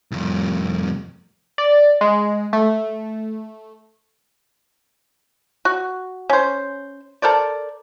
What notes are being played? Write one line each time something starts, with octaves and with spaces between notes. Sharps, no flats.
C2 F2
D5
G#3
A3
F#4
C#4 C5
A4 A#4 C5 D5